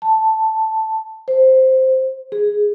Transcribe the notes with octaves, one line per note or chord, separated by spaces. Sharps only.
A5
C5
G#4